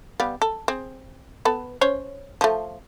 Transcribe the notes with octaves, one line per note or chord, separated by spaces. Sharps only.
G3 B3 F5
A4
C4 G#4
B3 A4 B4
C#4 C5 C#5
F3 A3